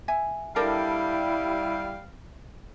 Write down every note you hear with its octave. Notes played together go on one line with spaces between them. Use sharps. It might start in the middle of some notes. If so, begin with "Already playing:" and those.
E5 G#5
G3 D4 E4 A4 A#4 F5